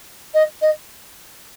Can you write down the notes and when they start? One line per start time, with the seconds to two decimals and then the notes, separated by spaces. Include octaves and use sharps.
0.33 D#5
0.61 D#5